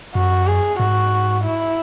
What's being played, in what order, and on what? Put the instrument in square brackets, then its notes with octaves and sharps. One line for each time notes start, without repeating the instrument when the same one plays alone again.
[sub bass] F#2 [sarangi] F#4
[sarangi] G#4
[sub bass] G#2 [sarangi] F#4
[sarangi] E4